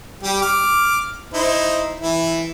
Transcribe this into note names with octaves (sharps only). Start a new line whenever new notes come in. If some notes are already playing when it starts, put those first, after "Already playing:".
G3 G4
D6 F6
D#4 E4 C5
E3 E4